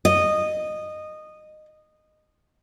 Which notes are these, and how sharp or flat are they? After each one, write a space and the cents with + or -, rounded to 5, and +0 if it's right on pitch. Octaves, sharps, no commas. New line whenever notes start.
D#5 -15